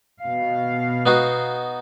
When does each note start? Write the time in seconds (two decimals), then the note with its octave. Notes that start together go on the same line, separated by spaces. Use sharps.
0.23 B2 F5
1.06 B3 D#4 F#4